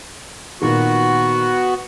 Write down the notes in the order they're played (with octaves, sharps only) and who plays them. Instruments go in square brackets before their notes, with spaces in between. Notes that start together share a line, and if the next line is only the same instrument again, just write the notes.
[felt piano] A#2 D#3 [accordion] B3 F#4